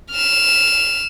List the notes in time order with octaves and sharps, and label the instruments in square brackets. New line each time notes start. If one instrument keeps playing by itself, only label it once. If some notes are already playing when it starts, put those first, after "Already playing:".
[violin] F6 E7